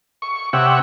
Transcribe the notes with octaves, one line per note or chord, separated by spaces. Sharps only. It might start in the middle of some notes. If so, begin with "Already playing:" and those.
C#6
C3 G4 C#5 E5 F#5